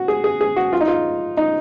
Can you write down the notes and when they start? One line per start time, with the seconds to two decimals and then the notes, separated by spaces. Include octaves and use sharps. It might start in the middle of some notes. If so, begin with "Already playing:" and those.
Already playing: F#4
0.08 G#4
0.24 G#4
0.41 G#4
0.56 F#4
0.73 F4
0.81 D#4
0.88 F4
1.37 D#4